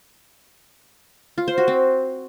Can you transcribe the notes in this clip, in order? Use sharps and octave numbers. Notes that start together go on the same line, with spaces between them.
F4
C5
F#4
C4